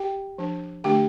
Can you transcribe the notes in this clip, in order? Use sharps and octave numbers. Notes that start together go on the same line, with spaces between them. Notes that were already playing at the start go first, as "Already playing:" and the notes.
Already playing: G4 G5
F3 D4
D3 A3 D4 G4 G5